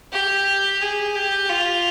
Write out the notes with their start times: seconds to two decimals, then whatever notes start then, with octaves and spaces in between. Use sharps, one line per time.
0.12 G4
0.81 G#4
1.15 G4
1.49 F4